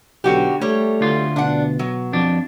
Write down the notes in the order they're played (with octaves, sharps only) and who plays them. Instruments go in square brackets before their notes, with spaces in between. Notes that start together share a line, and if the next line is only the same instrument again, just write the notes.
[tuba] B1 [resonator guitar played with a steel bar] D3 F#4 G4
[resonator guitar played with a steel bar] G3 C#5 [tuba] A3
[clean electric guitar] D2 F4
[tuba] B2 [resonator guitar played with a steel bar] D4 F#5
[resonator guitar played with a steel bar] F#3
[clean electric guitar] F2 D4